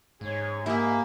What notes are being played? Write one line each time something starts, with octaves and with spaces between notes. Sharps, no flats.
G#2 G#4 C#5
A#3 E4 G4 G#4 E5